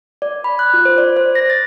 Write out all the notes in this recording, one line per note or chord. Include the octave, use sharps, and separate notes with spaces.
D5
B5
F#6
F4
C5
D5
C5
A#6
A6